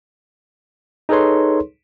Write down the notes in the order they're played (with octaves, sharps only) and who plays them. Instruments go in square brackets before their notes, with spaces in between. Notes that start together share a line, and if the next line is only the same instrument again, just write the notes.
[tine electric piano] D#4 G#4 A4 B4 C#5 C6